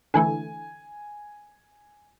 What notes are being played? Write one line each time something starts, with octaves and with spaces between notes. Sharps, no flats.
D3 E3 A3 G#5